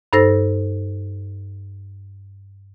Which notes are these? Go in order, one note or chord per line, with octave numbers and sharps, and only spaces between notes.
G2 D#4 A4 C5 E6 A#6